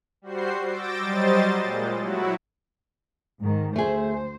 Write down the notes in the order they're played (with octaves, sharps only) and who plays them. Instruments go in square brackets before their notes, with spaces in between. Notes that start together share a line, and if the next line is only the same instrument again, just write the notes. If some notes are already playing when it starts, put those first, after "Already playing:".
[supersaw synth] G3 F#4 C5 C7
D6 E6 G6 A6 A#6 D7
F#3 G3 C5 D#5 A6
A#2 G#3
F#3 E4 F#4
[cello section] G#2 D#3
[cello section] D2 C5 [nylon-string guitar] A3 G#4